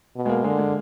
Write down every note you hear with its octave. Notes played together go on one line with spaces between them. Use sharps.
B2
G#3
A#3
D3 G#3
G#3